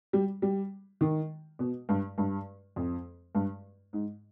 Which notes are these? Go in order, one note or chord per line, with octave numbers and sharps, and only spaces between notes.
G3
G3
D#3
B2
G2
G2
F2
G2
G#2